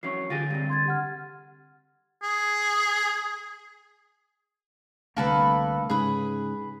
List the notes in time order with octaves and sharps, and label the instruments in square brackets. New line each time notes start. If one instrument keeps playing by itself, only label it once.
[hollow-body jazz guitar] E3 F#3 C#4 [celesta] C#6 C7
[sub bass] D3 [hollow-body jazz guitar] F4 G4 G#4 [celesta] A6 A#6 D#7
[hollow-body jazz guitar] G2 C3
[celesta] C6 G#6 A6
G4 F#5 F6
[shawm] G#4
[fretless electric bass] C2 D3 A3 [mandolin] A#3 A4 B4
[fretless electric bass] G#2 C#3 [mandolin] G#4 B4